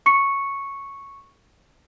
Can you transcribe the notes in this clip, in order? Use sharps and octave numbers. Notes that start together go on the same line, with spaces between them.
C#6 C#7